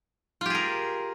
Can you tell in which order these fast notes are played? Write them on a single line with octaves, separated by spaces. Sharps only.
F4 G4 G#4 A#4